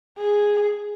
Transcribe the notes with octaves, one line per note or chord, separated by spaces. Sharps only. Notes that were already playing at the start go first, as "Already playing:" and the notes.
G#4